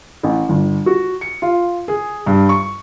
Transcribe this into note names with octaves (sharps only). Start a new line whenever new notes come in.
A1
G1
F#4
C#7
F4
G#4
G2
C#6